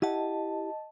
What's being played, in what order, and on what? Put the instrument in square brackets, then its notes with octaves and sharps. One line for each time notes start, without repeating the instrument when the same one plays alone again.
[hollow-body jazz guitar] E4 G4 F#5 [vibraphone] D#5 A5